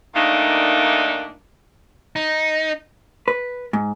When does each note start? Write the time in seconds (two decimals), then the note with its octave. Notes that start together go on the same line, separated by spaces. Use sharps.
0.15 A#2 D#3 A3 A#3 D4 D#4
2.16 D#4
3.28 B4
3.73 G#2